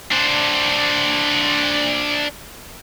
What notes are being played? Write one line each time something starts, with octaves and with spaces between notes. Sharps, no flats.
D4 C5